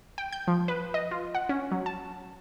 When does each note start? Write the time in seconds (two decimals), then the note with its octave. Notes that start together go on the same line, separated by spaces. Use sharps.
0.18 G5
0.33 G6
0.48 F3
0.68 B4
0.94 D#5
1.11 F4
1.35 F#5
1.49 C#4
1.71 F#3
1.86 A5